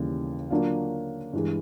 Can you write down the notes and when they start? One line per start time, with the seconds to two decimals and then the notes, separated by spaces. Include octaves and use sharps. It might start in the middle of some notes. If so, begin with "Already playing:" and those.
Already playing: D#2 C#3 E3 G3
0.50 D3 F#3 A#3 D4 F4
1.33 G2 E3 G#3